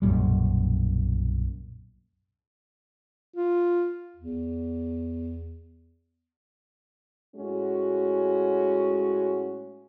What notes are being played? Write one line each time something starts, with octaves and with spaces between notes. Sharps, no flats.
B1 F#2 A#2 G3
F4
E2
A2 G#3 C#4 F#4